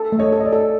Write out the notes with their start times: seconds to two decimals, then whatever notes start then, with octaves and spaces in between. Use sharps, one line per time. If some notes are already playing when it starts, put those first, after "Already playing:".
Already playing: A4
0.12 A3
0.18 C#5 D#5
0.32 A4
0.40 D#5
0.46 D5
0.53 A4